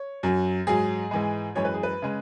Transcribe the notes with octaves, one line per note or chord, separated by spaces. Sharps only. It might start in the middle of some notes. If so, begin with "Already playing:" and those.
Already playing: C#5
F#2 F#3
G#2 F#3 G#4
G#2 E3 G#3
F#2 E3 G#3 C#5
B4
G#4
B4
C#3 G#3